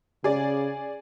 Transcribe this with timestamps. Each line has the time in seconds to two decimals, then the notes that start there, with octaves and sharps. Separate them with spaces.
0.24 C#3 G#4 D5